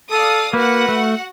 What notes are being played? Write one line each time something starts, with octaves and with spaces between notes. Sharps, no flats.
A4 D5 F5 D#6
A#3 F#4 B4 F#5
A3